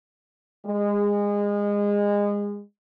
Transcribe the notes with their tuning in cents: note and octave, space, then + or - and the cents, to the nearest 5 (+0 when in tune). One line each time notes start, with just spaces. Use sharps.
G#3 -25